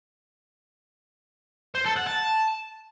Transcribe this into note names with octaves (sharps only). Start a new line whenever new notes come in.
C5
A4
F#5
A5